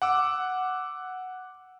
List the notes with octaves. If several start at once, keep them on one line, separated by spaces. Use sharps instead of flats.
F#5 D6 E6